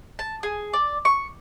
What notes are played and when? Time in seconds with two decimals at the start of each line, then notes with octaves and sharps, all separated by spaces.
0.19 A5
0.43 G#4
0.73 D5
1.05 C#6